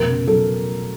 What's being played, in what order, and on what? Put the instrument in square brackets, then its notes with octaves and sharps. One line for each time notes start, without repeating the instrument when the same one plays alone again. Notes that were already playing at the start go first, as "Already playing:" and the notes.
Already playing: [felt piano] F1 B2 A#4
C#3
F#3 A4